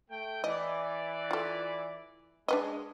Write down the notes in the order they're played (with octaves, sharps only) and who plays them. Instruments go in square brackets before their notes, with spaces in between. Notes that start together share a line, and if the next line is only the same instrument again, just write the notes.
[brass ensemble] A3 G5
[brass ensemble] E3 D5 [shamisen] D#5
[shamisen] F4 A4
[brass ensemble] G#3 [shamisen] D4 B4 D#5